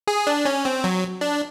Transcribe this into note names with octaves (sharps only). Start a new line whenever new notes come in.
G#4
D4
C#4
C4
F#3
D4